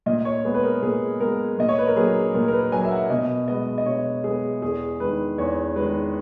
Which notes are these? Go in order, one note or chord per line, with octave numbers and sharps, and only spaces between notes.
A#2 D#5
C#5
G#3 B3 G#4
B4
A#4
A#2 G#4
G#3 B3 A#4
A#2 D#5
C#5
B4
A#4
F#3 A#3 G#4
A#2 A#4
A#4
B4
F#3 A#3 G#5
E5
F#5
B2 D#5
G#3 B3 D#5
D#5
B2 C#5
G#3 B3 G#4
E2 G#4
D#3 G#3 B4
E2 C#5
D#3 G#3 B4